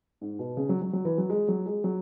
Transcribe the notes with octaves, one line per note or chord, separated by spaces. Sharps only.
G#2
B2
C#3
F#3
F#3
F#3
E3
F#3
G#3
F#3
G#3
F#3